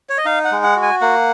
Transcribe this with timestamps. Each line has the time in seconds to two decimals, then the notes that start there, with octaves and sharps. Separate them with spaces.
0.09 C#5
0.18 D#5
0.25 D#4 F5
0.45 F#5
0.51 G#3
0.64 F#5
0.76 F#4
0.82 G#5
1.01 A#3 F#5